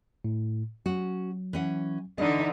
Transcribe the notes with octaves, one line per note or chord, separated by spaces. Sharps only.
A2
F#3 C#4 F#4
E3 C#4 F#5
D3 E3 D#4 D#5